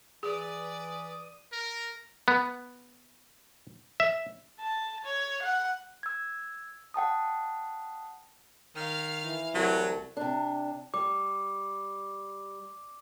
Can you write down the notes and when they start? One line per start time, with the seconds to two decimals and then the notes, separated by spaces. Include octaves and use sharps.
0.23 E3 G#4 B4 D5 D#6
1.52 A#4
2.28 B3
4.00 E5
4.60 A5
5.04 C#5
5.42 F#5
6.03 E6 G#6
6.94 F#5 G5 A5 D#6
8.76 D#3 F5 F6
9.25 E3
9.55 C2 F#3 A3
10.17 C3 D4
10.94 G3 D6